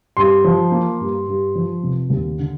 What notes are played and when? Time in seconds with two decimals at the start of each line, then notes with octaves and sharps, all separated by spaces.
0.17 G2 C6
0.45 F3
0.72 A#3
1.00 G2
1.28 G2
1.55 F3
1.83 F1
2.10 D#2
2.39 D3